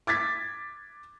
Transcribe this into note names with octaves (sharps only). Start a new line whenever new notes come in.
D6 G#6 A6 B6